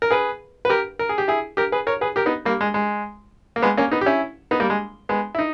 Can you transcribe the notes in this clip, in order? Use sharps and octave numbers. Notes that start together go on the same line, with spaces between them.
A#4
G#4 B4
B4
G4 A#4
A#4
G#4
G4
E4 G#4
G4 A#4
G#4 B4
A#4 C#5
G#4 B4
G4 A#4
B3 D#4
G3 A#3
G#3
G#3
A#3
G#3 B3
A#3 C#4
B3 D#4
G4
C#4 E4
B3 D#4
G3 A#3
G#3
G#3 B3
E4
D#4